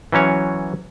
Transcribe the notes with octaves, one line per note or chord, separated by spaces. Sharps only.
E3 F#3 C#4 C#5